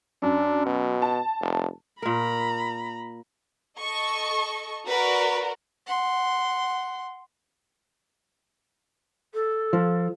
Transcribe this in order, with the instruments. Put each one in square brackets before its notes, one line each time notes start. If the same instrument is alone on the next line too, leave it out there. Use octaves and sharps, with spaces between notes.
[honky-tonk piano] F#2 [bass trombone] D4
[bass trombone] B2
[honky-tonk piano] A5
[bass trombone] F1
[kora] A#2 A#4 [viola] A#5 B5
[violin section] A4 D#5 C#6
[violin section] F#4 A#4 D5 [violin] B4
[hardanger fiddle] F#5 C6
[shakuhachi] A4
[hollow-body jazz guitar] F3